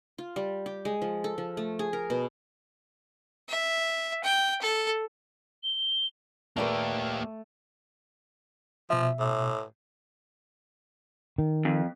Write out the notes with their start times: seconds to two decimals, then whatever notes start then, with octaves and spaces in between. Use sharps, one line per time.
0.18 F4
0.36 G3
0.66 G4
0.85 G#3
1.02 F3
1.24 A4
1.38 F3
1.57 A3
1.79 G#4
1.93 A#4
2.10 B2
3.49 E5
4.24 G5
4.62 A4
5.63 G7
6.56 A#2 A3 A#3 G4 A#4 B4
8.90 B2 F3 E5
9.19 A2
11.38 D#3
11.65 F2